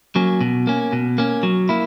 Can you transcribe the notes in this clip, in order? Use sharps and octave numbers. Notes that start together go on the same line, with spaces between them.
F#3 A#3 C#4
B2
A#3 C#4
B2
A#3 C#4
F#3
A#3 E4